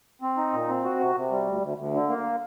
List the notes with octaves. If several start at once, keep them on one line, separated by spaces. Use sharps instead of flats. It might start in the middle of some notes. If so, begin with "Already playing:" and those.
C4
D#4
A#2
C4
F#4
C3
C3
G3
D2
D2
D2
D3
A#3